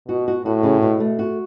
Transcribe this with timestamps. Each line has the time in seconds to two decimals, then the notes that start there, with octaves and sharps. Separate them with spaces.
0.08 B2 F#4
0.28 F#4
0.45 A2 F#4
0.63 C#3
0.82 B2
1.00 A3
1.19 F#4